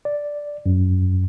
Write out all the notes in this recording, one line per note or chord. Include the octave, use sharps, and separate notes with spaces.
D5
F#2